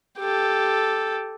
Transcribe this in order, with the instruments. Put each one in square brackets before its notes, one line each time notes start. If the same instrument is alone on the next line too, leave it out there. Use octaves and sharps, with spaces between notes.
[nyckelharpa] G4 A4